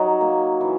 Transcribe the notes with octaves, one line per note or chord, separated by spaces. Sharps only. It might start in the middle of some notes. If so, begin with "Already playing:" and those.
Already playing: F#3 D#4
A#3
E3